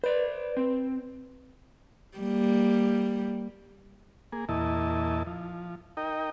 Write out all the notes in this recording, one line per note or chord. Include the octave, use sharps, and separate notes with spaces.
B4 C5 D5
C4
G3 A#3
A#3 G#4
E2 A#2 E4 D#5 A5
F3
D#4 A#4 D#5 G5